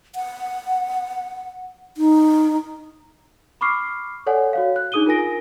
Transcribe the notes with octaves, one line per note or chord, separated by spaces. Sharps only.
F#5
D#4
B5 C#6 D6 F6 C7
A4 C#5 D5 F#5 G#5
F#4 C#5 F5
F#6
D4 D#4 G#4 D#6 D#7 G7
F4 A#4 G#5 A#6 D7